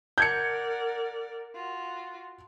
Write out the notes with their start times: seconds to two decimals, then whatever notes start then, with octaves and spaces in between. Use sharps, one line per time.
0.18 A#4 D5 F#5 G6 G#6 C#7
1.54 F4 F#4